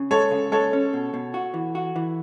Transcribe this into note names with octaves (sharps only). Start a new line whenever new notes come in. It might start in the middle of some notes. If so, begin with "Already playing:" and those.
Already playing: C#3
G#3 A4 C#5
C#3
G#3 A4 C#5
C#4
B2
B2
F#4
E3
F#4
E3